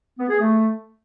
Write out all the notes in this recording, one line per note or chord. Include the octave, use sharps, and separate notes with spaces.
B3
G#4
A3